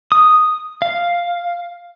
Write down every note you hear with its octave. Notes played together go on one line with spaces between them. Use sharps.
D#6
F5